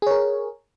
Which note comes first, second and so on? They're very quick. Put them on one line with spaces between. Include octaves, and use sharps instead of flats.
G#4 C#5 A#4